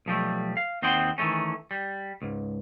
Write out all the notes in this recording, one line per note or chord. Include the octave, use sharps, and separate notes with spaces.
B1 F3 G3 A3
F5
D#2 C4 D#4 F#5 G5 C6
D#3 E3 F#3 A3 C#4
G3
C#2 G#2